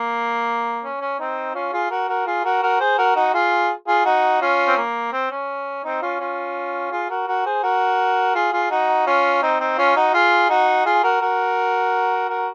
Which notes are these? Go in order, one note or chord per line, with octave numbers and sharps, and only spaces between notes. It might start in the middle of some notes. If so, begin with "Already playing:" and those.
Already playing: A#3
C#4
C#4
C4 D#4
C#4 F4
F4 G#4
F#4 A#4
F#4 A#4
F4 G#4
F#4 A#4
F#4 A#4
G#4 C5
F#4 A#4
D#4 F#4
F4 G#4
F4 G#4
D#4 F#4
C#4 F4
C4
A#3
C4
C#4
C4 D#4
C#4 F4
C#4 F4
F4 G#4
F#4 A#4
F#4 A#4
G#4 C5
F#4 A#4
F4 G#4
F4 G#4
D#4 F#4
C#4 F4
C4 D#4
C4 D#4
C#4 F4
D#4 F#4
F4 G#4
D#4 F#4
F4 G#4
F#4 A#4
F#4 A#4
F#4 A#4